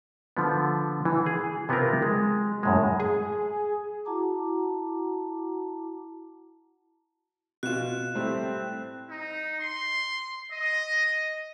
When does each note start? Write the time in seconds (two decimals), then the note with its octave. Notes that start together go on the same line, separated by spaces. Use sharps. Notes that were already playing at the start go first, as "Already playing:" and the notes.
0.37 D3 F3 B3
1.05 E3
1.26 G#4
1.69 C3 B3 C4 F4 A#4
2.02 G#3
2.63 F#2 A2 G#3
3.00 G#4
4.05 E4 F#4 F#5 A5 A#5 D6
7.63 B2 F4 F#6 E7
8.15 A2 G3 A3 C4
9.10 D#4
9.60 C6
10.52 D#5